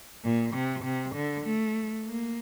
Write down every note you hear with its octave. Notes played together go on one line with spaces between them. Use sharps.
A#2
C3
C3
D3
A3
A#3